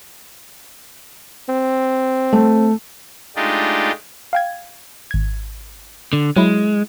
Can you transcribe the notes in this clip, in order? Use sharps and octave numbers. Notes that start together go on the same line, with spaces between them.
C4
A3
G#3 A3 D4 D#4 F4 G4
F5 G5 G#6
G#1 G#6
D3
F#3 G#3 E4